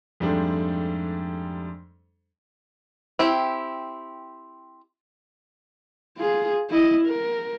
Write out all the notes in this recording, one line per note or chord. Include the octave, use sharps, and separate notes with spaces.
F2 G#2 G3 A3 D4
C4 E4 G4
F4 G#4
E4 D#5
A#4